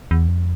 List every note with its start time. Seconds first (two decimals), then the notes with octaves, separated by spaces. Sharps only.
0.11 E2
0.28 F2